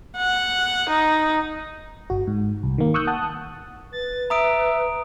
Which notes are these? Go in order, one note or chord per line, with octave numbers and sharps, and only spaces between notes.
F#5
D#4
G1 F#4
G#2
C2
D#3 A#3
C#6 D#6 E6 F#6 G6
F#5 A5 D#6 F#6
B4 A6
E5 A#5 D#6 D7